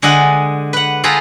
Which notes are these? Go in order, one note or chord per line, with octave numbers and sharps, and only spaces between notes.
D3 G#3 D5 D#5 F#5
B4 F#5
F4 G#4 A4 B4 G5 A#5